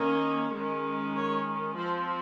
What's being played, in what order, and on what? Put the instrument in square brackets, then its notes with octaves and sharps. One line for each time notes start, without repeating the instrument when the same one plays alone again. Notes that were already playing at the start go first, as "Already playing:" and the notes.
Already playing: [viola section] D#3 A#3 C#4 D#5
D#3 G#3 C#4
C#5
F3 C4 C5